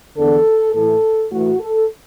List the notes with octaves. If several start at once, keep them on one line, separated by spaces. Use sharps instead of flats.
E2 D3 A4
A2 E3 A4
A2 E3 F#4
A4